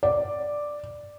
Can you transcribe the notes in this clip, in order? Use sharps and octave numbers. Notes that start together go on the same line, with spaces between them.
D5